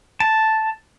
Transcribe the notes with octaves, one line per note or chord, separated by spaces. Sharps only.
A5